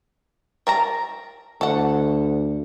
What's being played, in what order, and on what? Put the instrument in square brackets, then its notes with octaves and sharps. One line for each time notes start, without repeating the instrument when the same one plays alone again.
[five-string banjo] A#4 A5 A#5
[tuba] D2 [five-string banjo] A4 F#5